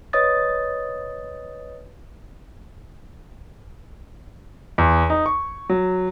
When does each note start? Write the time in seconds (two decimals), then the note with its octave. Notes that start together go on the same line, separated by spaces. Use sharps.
0.13 B4 C#5 D#5 D#6 A6
4.78 E2
5.10 D#4
5.26 C#6
5.70 F#3